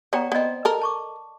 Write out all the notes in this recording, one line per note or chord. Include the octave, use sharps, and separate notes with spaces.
B3 C#5 D5 G5 A#5
B3 C4 D5 D#5
A4 A#4
A5 C#6 D6